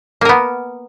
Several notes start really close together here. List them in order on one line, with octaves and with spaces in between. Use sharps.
A#3 A#4 B3